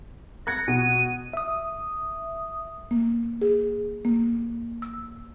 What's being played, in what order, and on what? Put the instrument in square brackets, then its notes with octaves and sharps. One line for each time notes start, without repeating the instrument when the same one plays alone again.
[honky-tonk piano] F#6 G#6 C#7 [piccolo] A#6
[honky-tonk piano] B2 [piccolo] D#7
[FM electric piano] E5 D#6
[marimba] A#3
G#4
A#3
E6